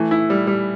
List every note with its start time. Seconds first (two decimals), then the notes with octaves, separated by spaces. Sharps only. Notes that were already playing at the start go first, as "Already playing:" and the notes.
Already playing: E3 A3
0.11 E4
0.30 G3
0.47 G3